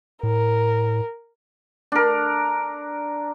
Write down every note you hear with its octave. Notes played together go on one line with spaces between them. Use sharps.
A2 A#4
D4 A#4